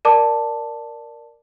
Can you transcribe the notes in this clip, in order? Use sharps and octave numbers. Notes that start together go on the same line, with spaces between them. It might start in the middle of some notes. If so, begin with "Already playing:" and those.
A#4 D5 A5 D6